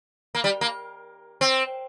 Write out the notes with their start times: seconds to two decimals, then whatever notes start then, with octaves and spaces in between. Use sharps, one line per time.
0.35 A#3
0.44 G3
0.61 A#3
1.41 C4